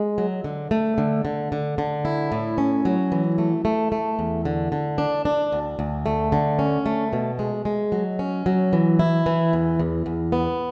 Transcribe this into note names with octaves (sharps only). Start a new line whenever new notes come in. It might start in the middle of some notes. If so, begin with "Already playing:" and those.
Already playing: G#3
F#3
D3
A3
D3
D3
D3
D3
E4
A2
C#4
F#3
E3
A3
A3
A3
E2
D3
D3
D4
D4
D2
D2
A3
D3
C#4
A3
B2
G#3
G#3
F#3
C#4
F#3
E3
E4
E3
E2
E2
E2
B3